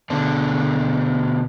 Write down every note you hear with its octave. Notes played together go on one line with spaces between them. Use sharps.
B2 D3 D4